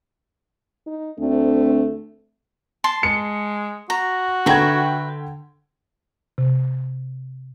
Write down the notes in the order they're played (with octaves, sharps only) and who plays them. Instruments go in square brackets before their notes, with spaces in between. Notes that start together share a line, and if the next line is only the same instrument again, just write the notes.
[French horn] D#4
[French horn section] D2 C4 D4 [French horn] A3
[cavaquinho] A5 C6
[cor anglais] G#3 [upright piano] C#7
[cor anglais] F#4 [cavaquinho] A#5
[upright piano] D3 G5 G#6 [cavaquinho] B4 E5 A#5
[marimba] C3